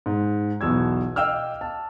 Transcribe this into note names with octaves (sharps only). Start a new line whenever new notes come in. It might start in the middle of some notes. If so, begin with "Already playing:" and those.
G#2
B1 E2 B2 E6 G#6
D#5 F5 G5 E6 F6
A5